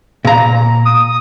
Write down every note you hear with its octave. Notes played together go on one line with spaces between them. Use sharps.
A#2 A#5
D#6